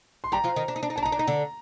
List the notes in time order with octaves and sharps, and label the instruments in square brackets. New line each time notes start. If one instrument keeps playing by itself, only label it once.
[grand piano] C6
[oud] G3 G4 [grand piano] A#5
[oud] F3 F4
D#3 D#4
D4
D#4
D4
D#4
[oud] D4 [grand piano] A5
[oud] D#4 [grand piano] A#5
[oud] D4
D#4
D3 D4